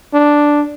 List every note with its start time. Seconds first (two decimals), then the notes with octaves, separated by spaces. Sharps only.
0.14 D4